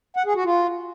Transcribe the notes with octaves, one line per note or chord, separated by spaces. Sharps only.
F#5
G#4
F#4
F4